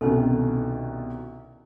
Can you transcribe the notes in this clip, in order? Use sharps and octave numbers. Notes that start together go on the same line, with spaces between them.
C2 B2 D#3 C#4 D#4 A4